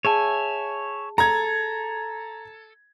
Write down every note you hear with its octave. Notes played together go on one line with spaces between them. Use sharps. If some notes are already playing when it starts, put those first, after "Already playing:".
G#4 C#5 E5 G#5 A5
A4 A#5 G#6